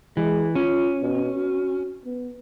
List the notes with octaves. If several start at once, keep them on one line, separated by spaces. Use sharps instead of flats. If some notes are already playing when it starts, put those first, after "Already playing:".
E3 G#3
C#4 F4
B2
F#4
B3